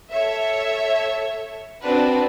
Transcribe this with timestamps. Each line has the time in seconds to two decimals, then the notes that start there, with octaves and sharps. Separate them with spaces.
0.12 A4 C#5 E5
1.83 C4 D4 F#4 B4